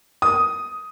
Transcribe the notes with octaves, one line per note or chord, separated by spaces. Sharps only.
D#6